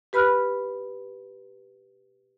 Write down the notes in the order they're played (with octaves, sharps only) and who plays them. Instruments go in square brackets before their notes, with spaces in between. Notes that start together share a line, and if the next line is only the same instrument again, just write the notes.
[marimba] G4 B4 B5 F6 F#6